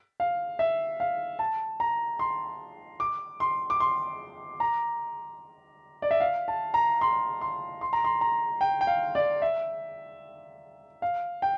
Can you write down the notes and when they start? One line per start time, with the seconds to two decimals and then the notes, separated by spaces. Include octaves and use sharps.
0.20 F5
0.59 E5
1.00 F5
1.39 A5
1.80 A#5
2.19 C6
3.00 D6
3.40 C6
3.70 D6
3.80 C6
4.60 A#5
6.02 D5
6.11 E5
6.20 F5
6.48 A5
6.74 A#5
7.01 C6
7.41 C6
7.81 C6
7.93 A#5
8.04 C6
8.21 A#5
8.61 G5
8.81 G5
8.87 F5
9.15 D5
9.42 E5
11.02 F5
11.42 G5